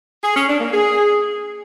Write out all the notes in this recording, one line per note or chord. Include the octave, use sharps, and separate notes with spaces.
G#4
C#4
D4
A#3
G#4